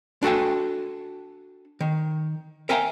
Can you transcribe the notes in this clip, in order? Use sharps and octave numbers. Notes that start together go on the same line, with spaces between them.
D4 F#4 A4 G5 G#5
D#3
A#4 E5 F5 G5 G#5 A#5